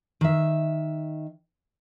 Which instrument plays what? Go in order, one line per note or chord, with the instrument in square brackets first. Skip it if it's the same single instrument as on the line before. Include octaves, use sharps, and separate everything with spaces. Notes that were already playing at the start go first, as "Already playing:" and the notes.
[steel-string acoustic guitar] D#3 E5